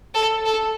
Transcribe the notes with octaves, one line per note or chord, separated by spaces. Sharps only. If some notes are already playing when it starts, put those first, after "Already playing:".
A4
A4